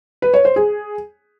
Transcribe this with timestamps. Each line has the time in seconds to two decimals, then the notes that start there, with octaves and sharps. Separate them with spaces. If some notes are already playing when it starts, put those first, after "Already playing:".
0.22 B4
0.34 C#5
0.45 C5
0.56 G#4